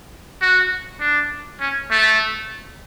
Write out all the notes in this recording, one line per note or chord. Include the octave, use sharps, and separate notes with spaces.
F#4
D4
C#4
A3